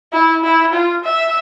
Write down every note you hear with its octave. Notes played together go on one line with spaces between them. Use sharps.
E4
E4
F4
E5